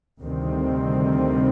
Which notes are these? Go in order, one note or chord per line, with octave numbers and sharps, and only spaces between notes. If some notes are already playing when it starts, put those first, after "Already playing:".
D2 C3 D#3 G3 C4